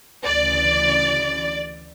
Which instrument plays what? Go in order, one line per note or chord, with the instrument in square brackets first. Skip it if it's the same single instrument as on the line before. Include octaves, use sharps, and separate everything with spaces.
[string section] D2 C#3 E3 D5